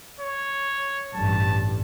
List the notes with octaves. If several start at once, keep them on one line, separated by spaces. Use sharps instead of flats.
C#5
A1 G2 A5